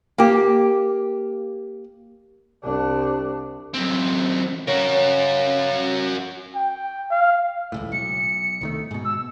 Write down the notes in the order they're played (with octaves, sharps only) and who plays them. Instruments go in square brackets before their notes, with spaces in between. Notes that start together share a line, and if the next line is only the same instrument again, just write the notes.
[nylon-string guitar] A#3 G4
[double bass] C2 D4
[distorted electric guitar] F#2 C4
[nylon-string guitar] C#3 [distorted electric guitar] F#4 A#4
[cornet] G5
F5
[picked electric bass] D#1 C#2 A2
[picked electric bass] B1 [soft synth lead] C#7
[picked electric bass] C2 D#3 A3
G#2 B2
[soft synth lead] E6